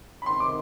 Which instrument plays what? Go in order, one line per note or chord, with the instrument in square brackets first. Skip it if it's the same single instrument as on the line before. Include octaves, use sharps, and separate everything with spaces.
[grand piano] B5
[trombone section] C#2 C3 D#3 [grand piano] C6
[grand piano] D6